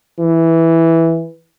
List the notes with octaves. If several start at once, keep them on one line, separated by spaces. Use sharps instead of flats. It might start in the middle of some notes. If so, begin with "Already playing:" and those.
E3